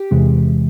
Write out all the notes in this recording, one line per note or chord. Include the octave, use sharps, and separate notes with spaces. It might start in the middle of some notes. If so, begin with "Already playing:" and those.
Already playing: G4
E2 C3 E3 G#3